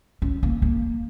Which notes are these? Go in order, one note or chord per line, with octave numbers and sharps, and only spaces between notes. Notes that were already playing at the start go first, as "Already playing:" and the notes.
C#4
A#3
A#3